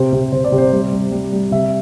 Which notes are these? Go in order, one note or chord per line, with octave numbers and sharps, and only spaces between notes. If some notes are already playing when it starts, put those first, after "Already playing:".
Already playing: C3 C5
C3
C3 C5
D5
C3
C5
G3 D5
G3
G3
G3
C3 E5